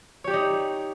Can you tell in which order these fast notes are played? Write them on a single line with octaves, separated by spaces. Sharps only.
C#5 G4 D5 D#4